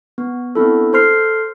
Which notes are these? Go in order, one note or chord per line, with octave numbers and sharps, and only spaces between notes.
B3
B3 C4 D4 E4 A4
A4 C5 C6 F6 C7